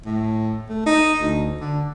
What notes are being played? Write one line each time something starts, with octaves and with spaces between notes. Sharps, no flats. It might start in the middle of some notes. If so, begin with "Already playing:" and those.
A2
A3
D#4
D2
D3